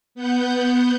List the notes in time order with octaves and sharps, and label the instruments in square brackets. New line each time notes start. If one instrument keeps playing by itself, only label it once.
[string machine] B3 F#5 G6